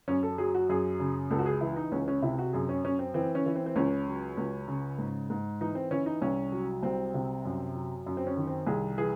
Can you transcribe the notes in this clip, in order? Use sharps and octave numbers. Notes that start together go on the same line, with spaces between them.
F#2 C#4
A4
F#3 G#4
F#4
F#2 G#4
C#3
C#2 A4
F#4
G#4
E3 E4
D#4
C#2 C#4
C#4
C3 E4
F#4
F#2 G#4
C#4
F#2 C#4
C4
E3 C4
C#4
E3
C4
C4
C#2 C#4
F#3
C#2
C#3
G#2
G#2
E3 D#4
C4
E3 C#4
D#4
C2 C#4
F#3
C2 C4
C3
F#2
F#3
F#2
C4
C#4
D#3
C4
C2 G#4
E3 G#4